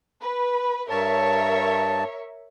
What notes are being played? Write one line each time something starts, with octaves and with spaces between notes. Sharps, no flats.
B4
G2 A#4 C#5 E5 A5